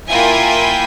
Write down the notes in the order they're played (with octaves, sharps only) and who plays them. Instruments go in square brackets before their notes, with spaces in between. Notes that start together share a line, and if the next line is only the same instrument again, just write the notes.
[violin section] A#3 E4 F4 G5 G#5